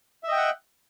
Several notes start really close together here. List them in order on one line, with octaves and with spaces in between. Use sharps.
E5 D#5 G5 F#5